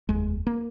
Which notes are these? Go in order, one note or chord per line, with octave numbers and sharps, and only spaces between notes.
F1 D#2 G#3
A#3